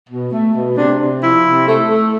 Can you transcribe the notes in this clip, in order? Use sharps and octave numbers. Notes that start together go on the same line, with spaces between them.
B2
A3
B2
C3 D4
C3
F3 E4
C3
A3
A3